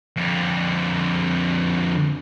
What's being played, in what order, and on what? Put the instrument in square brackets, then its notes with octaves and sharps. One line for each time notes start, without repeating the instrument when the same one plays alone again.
[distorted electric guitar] F2 D3